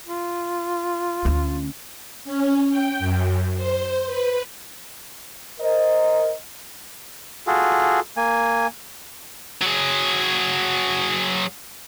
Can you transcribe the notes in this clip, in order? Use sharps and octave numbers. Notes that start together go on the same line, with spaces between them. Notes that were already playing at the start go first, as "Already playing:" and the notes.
F4
D2 C#4
C#4
G5
F#2
C5
B4
A#4 C5 D#5
F4 F#4 G#4 A4
A#3 G#5
F#3 G#4